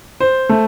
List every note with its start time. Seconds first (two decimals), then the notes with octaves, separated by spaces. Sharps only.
0.20 C5
0.49 A3